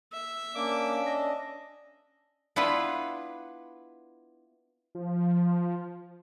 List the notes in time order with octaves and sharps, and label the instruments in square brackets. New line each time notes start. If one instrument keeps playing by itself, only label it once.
[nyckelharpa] E5
[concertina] A#3 D6 [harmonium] C#4 D4 D5
[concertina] D#5
[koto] B3 D4 E4 F4 B4
[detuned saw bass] F3